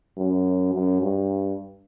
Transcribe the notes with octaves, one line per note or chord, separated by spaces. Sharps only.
F#2
F#2
G2